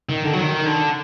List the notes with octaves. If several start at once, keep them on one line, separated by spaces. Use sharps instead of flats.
D#3
D3
F#3
D#3
D3